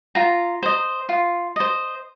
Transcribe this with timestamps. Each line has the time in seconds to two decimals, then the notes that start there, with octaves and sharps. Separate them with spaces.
0.15 F4 A#5
0.63 C5 D#5
1.09 F4
1.56 C5 D#5